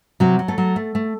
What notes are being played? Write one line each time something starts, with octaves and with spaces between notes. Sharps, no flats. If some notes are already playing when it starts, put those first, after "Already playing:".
C3 F#3 F#4
F#3
A3 A4
F#3
A3
A3